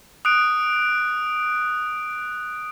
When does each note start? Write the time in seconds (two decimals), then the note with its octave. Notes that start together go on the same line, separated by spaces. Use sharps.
0.25 D#6 F#6 D7